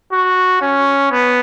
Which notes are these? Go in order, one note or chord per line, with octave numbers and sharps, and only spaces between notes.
F#4
C#4
B3